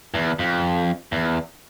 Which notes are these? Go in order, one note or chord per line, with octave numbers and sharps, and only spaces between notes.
E2
F2
E2